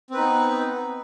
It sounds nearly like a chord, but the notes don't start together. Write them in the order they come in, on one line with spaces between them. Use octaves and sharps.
C4 B4 D#4 B3